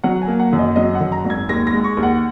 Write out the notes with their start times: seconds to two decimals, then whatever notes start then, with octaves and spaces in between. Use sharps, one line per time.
0.04 F#3 F#5
0.22 G#5
0.28 A#3
0.40 F#5
0.53 F#2
0.59 D#5
0.76 F#3 D#5
0.95 F#5
1.01 F#2
1.12 A#5
1.25 G#1
1.30 G#6
1.49 D#2 A#6
1.67 A#6
1.73 G#3
1.84 C#6
1.97 D#2
2.03 F#5